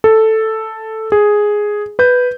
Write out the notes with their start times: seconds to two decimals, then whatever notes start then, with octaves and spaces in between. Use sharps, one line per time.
0.04 A4
1.12 G#4
1.99 B4 G6